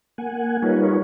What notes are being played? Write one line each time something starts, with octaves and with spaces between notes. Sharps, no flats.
A#3 F#5 G#5
G3 D#4 F4 A#4 B4 C#5